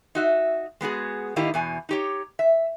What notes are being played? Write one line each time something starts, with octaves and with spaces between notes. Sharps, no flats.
D#4 F#4 E5
G#3 B3 F#4 G#4
A2 D#3 A#3 D#4 E4 G4
E2 B2 G#5
D#4 G4 C#5
E5